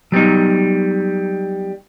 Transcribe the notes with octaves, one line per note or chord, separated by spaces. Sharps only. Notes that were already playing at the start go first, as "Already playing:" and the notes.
F#3 G3 B3 D#4